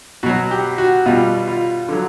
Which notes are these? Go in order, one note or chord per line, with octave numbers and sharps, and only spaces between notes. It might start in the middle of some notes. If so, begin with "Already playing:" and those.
B2 F#3 F#4
G4
F#4
B2 G3 F4
F4
D3 F#3